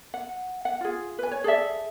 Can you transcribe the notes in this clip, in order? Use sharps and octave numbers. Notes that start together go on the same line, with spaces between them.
F#5
F#5
F4 G#4
B4 G#5
C#5
G#4 A4 D5 E5